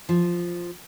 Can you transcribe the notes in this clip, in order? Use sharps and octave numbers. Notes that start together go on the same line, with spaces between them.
F3